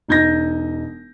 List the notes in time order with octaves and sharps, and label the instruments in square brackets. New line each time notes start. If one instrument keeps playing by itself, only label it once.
[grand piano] E1 D#4 G6 G#6 A#6